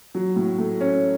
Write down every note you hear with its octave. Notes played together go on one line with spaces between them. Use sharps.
F#3
A2
A3
C#4